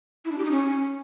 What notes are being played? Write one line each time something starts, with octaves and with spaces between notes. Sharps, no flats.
E4
D4
G4
D#4
C#4